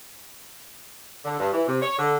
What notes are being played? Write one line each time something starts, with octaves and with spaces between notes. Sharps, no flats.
D3
G2
E3
C3
C#5
D3